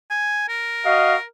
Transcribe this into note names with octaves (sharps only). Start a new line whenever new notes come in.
G#5
A#4
F#4 D#5 F5